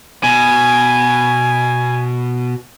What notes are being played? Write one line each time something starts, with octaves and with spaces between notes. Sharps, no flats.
B2 G#5